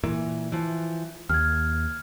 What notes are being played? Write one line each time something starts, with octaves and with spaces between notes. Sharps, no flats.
A#2 E3
E3 F3
D#2 F6 G#6